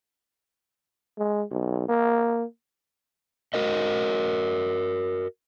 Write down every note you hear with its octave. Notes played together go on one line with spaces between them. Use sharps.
G#3
B1
A#3
F#4 A#4 D#5